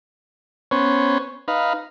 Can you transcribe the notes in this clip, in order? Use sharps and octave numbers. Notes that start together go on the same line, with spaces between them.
B3 C#4 C5 C#5
D#4 B4 F5